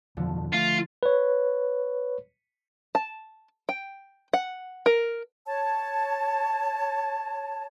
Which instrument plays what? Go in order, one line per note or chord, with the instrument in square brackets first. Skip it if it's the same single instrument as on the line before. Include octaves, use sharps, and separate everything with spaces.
[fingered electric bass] E2 B2 D#3 [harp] D3 F3
[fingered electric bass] A3 [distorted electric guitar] F4
[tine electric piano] B4 C#5
[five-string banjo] A5
G5
F#5
A#4
[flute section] C#5 A5